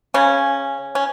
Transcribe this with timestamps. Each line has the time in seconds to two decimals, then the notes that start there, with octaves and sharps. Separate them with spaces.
0.14 C#3 C#4
0.95 C#4